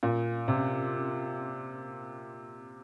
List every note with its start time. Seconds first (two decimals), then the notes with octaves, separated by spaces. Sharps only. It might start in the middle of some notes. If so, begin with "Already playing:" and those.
0.03 A#2
0.48 C3